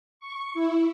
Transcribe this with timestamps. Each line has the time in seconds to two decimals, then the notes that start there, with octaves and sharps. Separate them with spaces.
0.20 C#6
0.54 E4